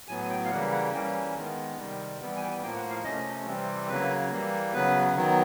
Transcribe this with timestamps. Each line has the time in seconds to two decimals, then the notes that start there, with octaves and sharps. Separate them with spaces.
0.08 A2 F#3 B3 G#5
0.30 G5
0.45 F5
0.51 C#3 E3 G3 A#3 F#5
0.72 F#5
0.93 E3 G3 A#3 C#4 G5
1.35 D#3 G#3 B3
1.78 C3 D#3 G3
2.19 E3 G3 B3
2.37 G#5
2.41 G5
2.62 A2 F3 A#3 G5
2.76 F#5
2.90 F5
3.04 C3 F3 A3 C#4 D#5
3.46 C3 E3 G3 C4
3.88 C#3 F#3 A#3 B4
4.31 E3 G3 A#3
4.73 C#3 F#3 B3 B4
5.15 D#3 F#3 B3